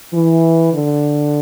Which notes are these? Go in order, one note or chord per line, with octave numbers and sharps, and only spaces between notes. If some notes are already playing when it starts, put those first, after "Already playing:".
E3
D3